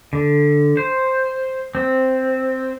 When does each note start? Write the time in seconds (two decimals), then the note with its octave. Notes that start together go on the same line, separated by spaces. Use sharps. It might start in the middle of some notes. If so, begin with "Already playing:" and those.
0.13 D3
0.77 C5
1.75 C4